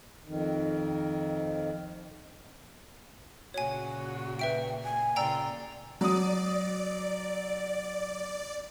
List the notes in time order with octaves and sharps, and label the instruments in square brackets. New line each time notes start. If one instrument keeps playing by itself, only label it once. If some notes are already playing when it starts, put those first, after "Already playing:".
[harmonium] F2 D#3
[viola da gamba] A#2 C#3 [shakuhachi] F#4 [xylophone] C#5 G#5
[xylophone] B4 E5 D7 [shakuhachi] G5
[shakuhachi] G#5
[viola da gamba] A#2 C#3 F4 [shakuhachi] D5 [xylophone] G5 A#5 E6
[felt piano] F#3 D#6 [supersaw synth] D5